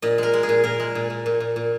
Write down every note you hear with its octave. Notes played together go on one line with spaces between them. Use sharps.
A#2 D#5
G#3 A#4
G#3
G#4
A#2
A#2 A#4
G#3
A#2
A#2
A#2
A#2
A#2